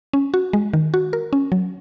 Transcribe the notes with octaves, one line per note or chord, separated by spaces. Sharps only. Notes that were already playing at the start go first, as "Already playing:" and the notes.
C#4
F#4
G#3
D#3
F#4
A#4
C#4
F#3